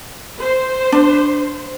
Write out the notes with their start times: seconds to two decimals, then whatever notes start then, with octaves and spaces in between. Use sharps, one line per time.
0.40 C5
0.92 D4